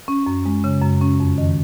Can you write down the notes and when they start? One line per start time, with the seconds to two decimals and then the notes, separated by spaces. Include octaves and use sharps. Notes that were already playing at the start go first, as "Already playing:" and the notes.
0.08 C#4
0.26 F#2
0.46 G#3
0.64 C#3
0.82 F#2
1.01 C#4
1.20 F2
1.38 D#3